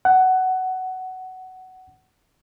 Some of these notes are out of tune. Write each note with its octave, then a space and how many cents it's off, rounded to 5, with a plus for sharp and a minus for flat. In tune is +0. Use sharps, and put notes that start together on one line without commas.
F#5 +15